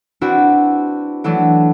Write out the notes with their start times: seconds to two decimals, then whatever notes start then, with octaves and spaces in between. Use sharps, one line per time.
0.21 C4 D4 E4 F#4 B4
1.24 E3 F#3 A3 D4 E4